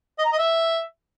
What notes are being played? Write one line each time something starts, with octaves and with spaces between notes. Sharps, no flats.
D#5
A#5
D#5
E5